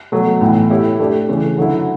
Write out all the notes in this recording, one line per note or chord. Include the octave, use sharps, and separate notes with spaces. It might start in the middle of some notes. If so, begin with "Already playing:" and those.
B2 F#3 A3
A2 E3 B3 E4
A3 E4 G4 C#5
A3 D4 G4
C#3 E3 A3 C#4
D3 F#3 C#4 E4